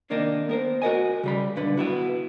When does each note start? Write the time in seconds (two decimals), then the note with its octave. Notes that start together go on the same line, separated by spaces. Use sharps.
0.10 C3 D#3 A#3 D4 D#4
0.49 B3 A#4 C5
0.82 F#4 A#4 D#5 G#5
1.24 C#3 G3 B5
1.56 B1 G2 D3 B4
1.77 B3 E4 F#4